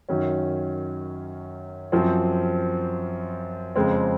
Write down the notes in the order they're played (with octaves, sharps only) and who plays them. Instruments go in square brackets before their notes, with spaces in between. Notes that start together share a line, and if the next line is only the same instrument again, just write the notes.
[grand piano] F#2 D#3 F#3 C#4
F#2 F3 C4
F2 C#3 G#3 C4